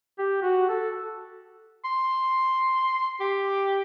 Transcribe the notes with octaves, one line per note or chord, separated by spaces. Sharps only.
G4
F#4
A4
C6
G4